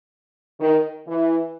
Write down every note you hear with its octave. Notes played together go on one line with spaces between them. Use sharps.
D#3
E3